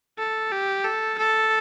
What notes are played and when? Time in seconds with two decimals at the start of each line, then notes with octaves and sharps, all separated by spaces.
0.18 A4
0.52 G4
0.84 A4
1.18 A4